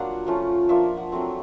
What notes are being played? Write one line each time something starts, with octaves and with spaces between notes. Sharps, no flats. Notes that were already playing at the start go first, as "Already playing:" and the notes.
Already playing: F#3 A#3 D4 F4 F#5
F3 A3 C#4 F4
F3 A#3 D4 E5
F#5
F#3 A3 C4